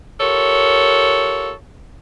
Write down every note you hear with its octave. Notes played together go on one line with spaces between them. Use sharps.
F4 G4 A4 A#4 C#5